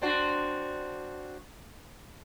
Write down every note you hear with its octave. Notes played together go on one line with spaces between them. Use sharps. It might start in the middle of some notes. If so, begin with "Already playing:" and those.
C4 D4 F#4